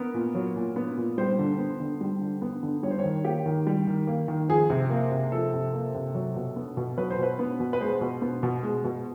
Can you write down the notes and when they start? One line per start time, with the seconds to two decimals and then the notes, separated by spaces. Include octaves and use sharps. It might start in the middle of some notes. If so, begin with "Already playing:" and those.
Already playing: B3 A#4
0.14 A#2
0.35 F#3
0.56 A#2
0.76 B3
0.97 A#2
1.18 G3 C5
1.39 D3
1.58 B3
1.80 D3
2.01 G3
2.21 D3
2.42 B3
2.63 D3
2.83 G3 C#5
2.91 C5
2.99 C#5
3.04 D#3
3.25 A#3 G4
3.46 D#3
3.67 G3
3.87 D#3
4.07 A#3
4.28 D#3
4.49 F3 G#4
4.70 C3
4.90 A#3
5.11 C3
5.32 F3 A4
5.53 C3
5.73 A#3
5.94 C3
6.15 F#3
6.36 B2
6.56 B3
6.77 B2
6.98 F#3 B4
7.10 C5
7.18 B2 B4
7.39 B3
7.60 B2
7.73 B4
7.81 G#3 C5
8.01 B2
8.22 B3
8.43 B2
8.63 G#3
8.84 B2